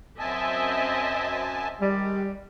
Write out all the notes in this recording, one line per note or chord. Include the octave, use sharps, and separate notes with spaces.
F#2 C4 D#5 E5 G#5 A5
D#3 G3 G#3